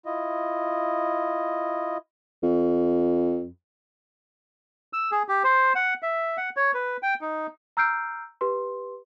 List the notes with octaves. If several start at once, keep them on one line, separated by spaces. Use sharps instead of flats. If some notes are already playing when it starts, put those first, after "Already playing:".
E4 F4 D#5
F2
E6
G#4
G4
C5
F#5
E5
F#5
C#5
B4
G5
D#4
A#5 E6 F6 G6 C7 D7
G4 B4 C6